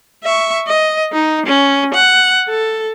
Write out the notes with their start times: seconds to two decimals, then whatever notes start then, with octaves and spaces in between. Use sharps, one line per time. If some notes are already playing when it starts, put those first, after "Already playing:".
0.24 E5 C#6
0.67 D#5
1.13 D#4
1.46 C#4
1.94 F#5
2.49 A4